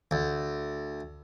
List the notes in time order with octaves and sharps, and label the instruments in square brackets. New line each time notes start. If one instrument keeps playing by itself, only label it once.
[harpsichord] D2